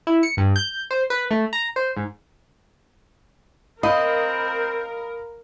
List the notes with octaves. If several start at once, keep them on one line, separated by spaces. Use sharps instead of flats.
E4
C#7
G2
G6
C5
B4
A3
A#5
C5
G#2
C4 A#4 D#5 F5 B5 D#6